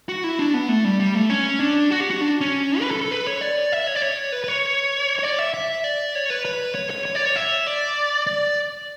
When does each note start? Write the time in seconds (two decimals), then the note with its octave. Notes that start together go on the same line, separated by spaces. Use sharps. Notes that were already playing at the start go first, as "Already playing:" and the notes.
0.09 F#4
0.24 E4
0.39 D4
0.54 B3
0.69 A3
0.84 G3
1.00 G3
1.15 A3
1.30 C#4
1.60 D4
1.91 F#4
2.00 G4
2.10 F#4
2.21 D4
2.41 C#4
2.81 B4
2.91 A4
3.01 A4
3.11 B4
3.27 C#5
3.41 D5
3.72 E5
3.87 C#5
3.95 D5
4.02 C#5
4.32 B4
4.44 B4
4.48 C#5
5.19 C#5
5.23 D5
5.39 E5
5.54 E5
5.84 D5
6.15 C#5
6.30 B4
6.45 B4
6.75 C#5
6.90 C#5
7.05 C#5
7.15 D5
7.25 C#5
7.36 E5
7.67 D5
8.27 D5